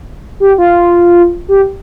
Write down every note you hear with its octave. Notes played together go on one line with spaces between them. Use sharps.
G4
F4
G4